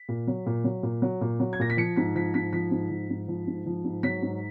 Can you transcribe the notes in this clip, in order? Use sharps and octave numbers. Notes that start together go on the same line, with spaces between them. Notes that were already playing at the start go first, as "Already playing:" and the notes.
Already playing: B6
A#2
F#3
A#2
F#3
A#2
F#3
A#2
F#3
G#6
A#2 A#6
B6
F3 C#7
G#2 B6
F3 B6
G#2 B6
F3 B6
G#2
F3
G#2
F3
G#2
F3
G#2
F#3 B6
G#2